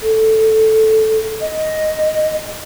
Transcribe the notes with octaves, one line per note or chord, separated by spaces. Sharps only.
A4
D#5